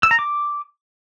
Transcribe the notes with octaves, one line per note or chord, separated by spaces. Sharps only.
E6
A#5
D6